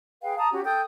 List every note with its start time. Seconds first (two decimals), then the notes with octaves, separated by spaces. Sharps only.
0.23 G#4 B4 F5 G5
0.37 A5 A#5 D#6
0.52 C#4 F#4 G4
0.65 A4 G5 D#6 G6